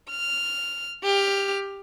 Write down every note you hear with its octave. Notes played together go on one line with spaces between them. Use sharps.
F6
G4 F6